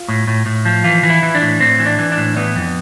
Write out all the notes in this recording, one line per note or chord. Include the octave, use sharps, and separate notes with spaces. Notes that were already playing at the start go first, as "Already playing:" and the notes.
Already playing: F4
A2
A2
A2
F3
E3 F4
E3
E4
E3
D4
A2
A2 C4
E3
D4
E3
D4
A2
E3 B3
F2